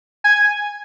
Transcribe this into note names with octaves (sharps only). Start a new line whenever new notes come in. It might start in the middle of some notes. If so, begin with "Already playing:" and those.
G#5